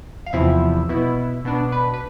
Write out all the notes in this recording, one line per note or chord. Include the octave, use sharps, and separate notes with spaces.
F5
E2 C3 F3 C4 E4 E5
B2 B3 E4
B2 B3 D4
B4
B4